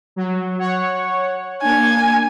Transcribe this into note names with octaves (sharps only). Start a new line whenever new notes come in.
F#3
C#5 F#5
A#3 D4 G#5